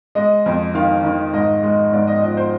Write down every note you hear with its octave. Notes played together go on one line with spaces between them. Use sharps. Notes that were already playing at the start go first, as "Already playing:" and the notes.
G#3 D#5
F2
D#3 F5
D#3
G#2 D#5
G#3
G#2 D5
D#5
F3 D#5
C5